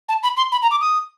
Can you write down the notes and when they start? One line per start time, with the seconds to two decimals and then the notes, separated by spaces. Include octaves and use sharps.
0.09 A5
0.23 B5
0.37 C6
0.52 B5
0.62 A#5
0.71 D6
0.81 D#6